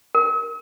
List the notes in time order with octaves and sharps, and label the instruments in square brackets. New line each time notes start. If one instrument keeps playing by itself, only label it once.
[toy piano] A#4